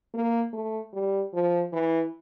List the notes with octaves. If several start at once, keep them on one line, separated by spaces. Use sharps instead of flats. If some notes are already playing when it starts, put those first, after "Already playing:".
A#3
A3
G3
F3
E3